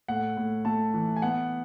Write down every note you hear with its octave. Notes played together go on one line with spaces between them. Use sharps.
A2 F#5
A2
A3 A5
E3
G#5
B3 F#5